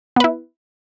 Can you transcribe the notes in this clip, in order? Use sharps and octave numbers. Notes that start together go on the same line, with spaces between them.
B3 E4 B4